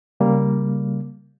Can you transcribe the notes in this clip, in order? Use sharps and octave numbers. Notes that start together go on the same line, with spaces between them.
C#3 G3 A#3